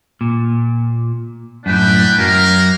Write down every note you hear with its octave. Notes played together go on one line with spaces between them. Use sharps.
A#2
F#2 A2 D4 B4 G5
F#2 F#3 A#3 A#4